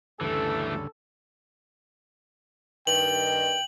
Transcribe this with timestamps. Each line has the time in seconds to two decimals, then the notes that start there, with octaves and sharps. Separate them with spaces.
0.21 D2 G2 C#3 E3 A3 A4
2.87 G2 D#3 G5 F#7